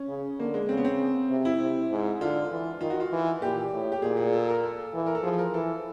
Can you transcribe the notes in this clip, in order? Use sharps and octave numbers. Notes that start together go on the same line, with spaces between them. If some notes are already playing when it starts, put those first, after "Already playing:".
Already playing: C#4
C#3
D3 A#3
G#3
C#3 C4
B3
C4
C3
E4
C3
G#2
D3 F4
E3
D#3 F4
F#4
F4
E3
A#2 G4
A2
G4
A#2 G#4
G#4
A4
A#4
A4
E3
A#4
A4
F3 G#4
A#4
E3 A4